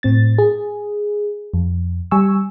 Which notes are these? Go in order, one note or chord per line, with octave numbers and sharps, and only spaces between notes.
A2 C4 A6
G#4
F2
G3 G#5 C#6 E6